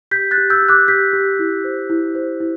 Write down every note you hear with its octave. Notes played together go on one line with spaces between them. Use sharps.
G4 G6 B6
F#6 A6
G4
E6 G6
G4
D6 F#6
G4 G6 B6
G4
E4
C5
E4
C5
E4